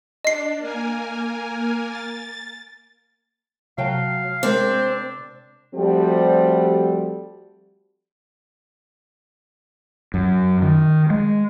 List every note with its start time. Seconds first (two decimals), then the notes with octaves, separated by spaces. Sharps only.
0.25 D4 D#5 C7
0.58 A#3 A#4 G#5
1.88 A6
3.78 C3 F#3 F5 G5 A5
4.43 G#3 C4 D4 A#4
5.75 F3 G3 A3 C4 F#4 G4
10.14 F#2
10.62 D#3
11.10 G#3